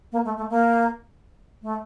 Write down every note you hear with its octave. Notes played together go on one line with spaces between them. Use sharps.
A#3
A3
A3
A#3
A3